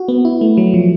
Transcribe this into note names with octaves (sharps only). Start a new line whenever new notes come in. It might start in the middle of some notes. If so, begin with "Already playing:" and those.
Already playing: F#4
B3
E4
A3
F#3
F3